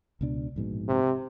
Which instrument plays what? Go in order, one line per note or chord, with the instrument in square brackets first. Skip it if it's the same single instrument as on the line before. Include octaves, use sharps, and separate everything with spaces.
[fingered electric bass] C#2 B2 D4
A#1 G#2 B2
[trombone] C3